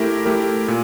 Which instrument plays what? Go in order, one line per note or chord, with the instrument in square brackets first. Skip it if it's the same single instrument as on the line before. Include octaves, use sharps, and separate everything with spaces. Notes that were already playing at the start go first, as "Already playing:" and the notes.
Already playing: [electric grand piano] A3 E4 G4 A#4
A3 E4 G4 A#4
A#2